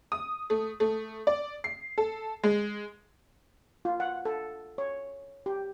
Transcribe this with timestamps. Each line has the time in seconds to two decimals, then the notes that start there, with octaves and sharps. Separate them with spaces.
0.12 D#6
0.50 A3
0.80 A3
1.27 D5
1.64 C7
1.98 A4
2.44 G#3
3.85 F4
4.00 F#5
4.25 A4
4.78 C#5
5.46 G4